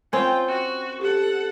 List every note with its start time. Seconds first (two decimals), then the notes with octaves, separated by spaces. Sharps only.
0.13 C4 C#4 F4 G5
0.47 F#4
1.01 G4 A4 F#5